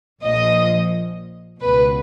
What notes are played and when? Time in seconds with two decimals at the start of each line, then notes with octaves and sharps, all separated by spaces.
0.22 A#1 A#2 F3 D#5
1.60 C#2 B2 B4